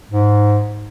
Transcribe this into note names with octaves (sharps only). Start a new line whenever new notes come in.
G#2